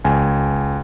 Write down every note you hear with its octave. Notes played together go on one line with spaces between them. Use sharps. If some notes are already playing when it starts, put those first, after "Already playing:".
C#2 G#5